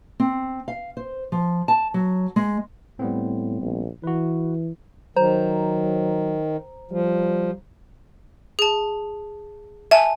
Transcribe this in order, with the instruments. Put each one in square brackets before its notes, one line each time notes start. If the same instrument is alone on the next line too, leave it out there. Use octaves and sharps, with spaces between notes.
[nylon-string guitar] C4
F5
C5
F3
A5
F#3
G#3
[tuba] A2 [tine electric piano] G3 B3 C4
[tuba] A#1
[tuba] E3 [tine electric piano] F#4 B4
[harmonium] D#3 [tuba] F#3 [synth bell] C5 A#5
[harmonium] F3 [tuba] G3
[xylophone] G#4 A5
[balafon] E5 [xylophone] G#5 A5